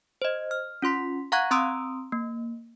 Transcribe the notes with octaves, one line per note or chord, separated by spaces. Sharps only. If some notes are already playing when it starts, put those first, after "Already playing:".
C5 D#5
F6
C#4 F4 C6 B6
F5 F#5 A#5 C#6 F#6 G#6
C4 A#5 C6 D#6 E6 D7
A#3